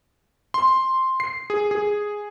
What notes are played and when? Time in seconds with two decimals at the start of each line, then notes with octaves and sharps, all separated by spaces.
0.54 C6
1.20 C7
1.50 G#4
1.71 G#4